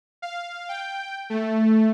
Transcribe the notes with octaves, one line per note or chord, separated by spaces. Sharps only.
F5
G5
A3